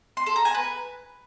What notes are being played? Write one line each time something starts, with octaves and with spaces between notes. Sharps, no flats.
C6
A4
A#5
G#5
B4